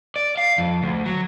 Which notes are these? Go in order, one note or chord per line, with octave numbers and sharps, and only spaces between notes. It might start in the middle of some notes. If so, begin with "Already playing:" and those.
D5
F5
F2
D2
F#3